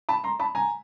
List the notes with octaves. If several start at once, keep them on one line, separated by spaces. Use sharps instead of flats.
A5 B5
A#5 C6
A5 B5
G#5 A#5